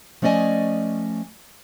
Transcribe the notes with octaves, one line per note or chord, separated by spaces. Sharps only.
F3 A3 C#4 D5 D#5 G#5